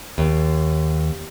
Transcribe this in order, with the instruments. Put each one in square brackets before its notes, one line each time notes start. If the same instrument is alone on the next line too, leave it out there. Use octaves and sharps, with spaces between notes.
[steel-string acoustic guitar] D#2